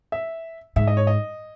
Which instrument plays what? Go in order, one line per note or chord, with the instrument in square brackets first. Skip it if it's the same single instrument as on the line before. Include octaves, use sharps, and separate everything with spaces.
[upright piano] E5
[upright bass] G#2 [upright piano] E5
[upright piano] D#5
C#5
D#5